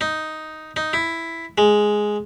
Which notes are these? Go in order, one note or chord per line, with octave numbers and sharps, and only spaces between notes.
D#4
D#4
E4
G#3